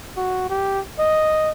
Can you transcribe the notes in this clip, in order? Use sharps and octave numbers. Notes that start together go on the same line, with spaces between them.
F#4
G4
D#5